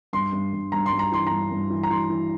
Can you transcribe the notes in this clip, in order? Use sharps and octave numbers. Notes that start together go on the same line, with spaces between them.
G2 C6
G2
G2
G2 A#5
C6
G2
A#5
E3 C6
G2 A#5
G2
E3
A#5
E3 C6
E3